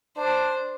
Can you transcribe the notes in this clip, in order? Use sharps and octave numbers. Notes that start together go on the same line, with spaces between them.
D4 C5